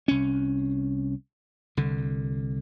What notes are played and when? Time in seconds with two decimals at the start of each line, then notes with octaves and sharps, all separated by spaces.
0.08 C2 C#4
1.77 C2 D3